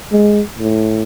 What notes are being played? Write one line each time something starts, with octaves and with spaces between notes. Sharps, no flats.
G#3
A2